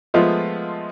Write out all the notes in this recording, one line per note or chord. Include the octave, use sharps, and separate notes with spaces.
F3 G#3 A3 B3 F4